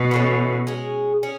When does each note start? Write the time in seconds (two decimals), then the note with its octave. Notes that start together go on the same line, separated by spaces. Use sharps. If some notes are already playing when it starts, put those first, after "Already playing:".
Already playing: B2
0.11 E3 A3 C#4
0.67 G#3 C#4 G#4
1.23 C#4 G#4